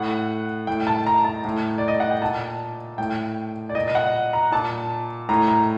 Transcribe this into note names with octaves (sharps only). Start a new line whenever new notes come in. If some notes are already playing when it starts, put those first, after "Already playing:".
Already playing: A2 F#5
A2 G5
A5
A#5
A5
A2
D5
D#5
F#5
G5
A#2 A5
A2 G5
D5
A#2 D#5
D#5
F#5
A#5
A#2 A5
A2 A#5
A#5